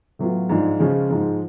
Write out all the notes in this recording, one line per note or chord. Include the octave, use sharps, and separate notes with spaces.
A2 F#3 B3 F4
G#2 F3 G#3 D4 F4
C#3 F3 G#3 C#4 F4
G#2 F3 G#3